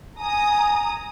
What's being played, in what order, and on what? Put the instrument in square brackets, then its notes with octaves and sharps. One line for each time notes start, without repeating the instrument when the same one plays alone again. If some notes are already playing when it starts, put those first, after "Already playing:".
[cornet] G#5 [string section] A#5 D#6